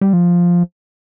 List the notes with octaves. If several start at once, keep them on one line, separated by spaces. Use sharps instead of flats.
G3
F3